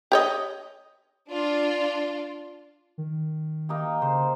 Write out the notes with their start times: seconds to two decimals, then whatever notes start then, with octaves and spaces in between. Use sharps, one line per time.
0.12 G4 C#5 D#5
1.31 D4 F4
2.98 D#3
3.69 A#3 D#4 G4
4.02 C#3 C5